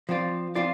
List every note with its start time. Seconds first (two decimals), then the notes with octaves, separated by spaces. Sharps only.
0.09 F3 C4 F4 D5
0.55 F3 C4 F4 D5